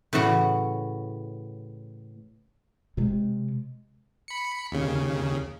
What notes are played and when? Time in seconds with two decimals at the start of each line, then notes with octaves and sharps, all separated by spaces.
0.13 A2 C#3 E3 F#4 F#5
2.97 C3 G#3
4.28 B5 C#7
4.72 D#2 C#3